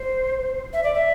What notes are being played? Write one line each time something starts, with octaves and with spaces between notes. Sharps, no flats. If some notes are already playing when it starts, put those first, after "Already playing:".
Already playing: C5
E5
D5
E5